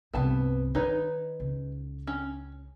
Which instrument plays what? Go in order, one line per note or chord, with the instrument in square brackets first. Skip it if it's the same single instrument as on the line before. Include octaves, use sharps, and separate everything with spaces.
[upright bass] C2 G2 [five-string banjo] B3 A5
[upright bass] D#3 [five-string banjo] D#4 B4 C#5
[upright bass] C#2
[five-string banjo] C#4